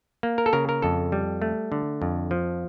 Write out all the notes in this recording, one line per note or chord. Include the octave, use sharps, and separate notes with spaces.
A#3
A#4
A4
C#3 A#4
A#4
F2 A4
G3
A3
D3
F2
F3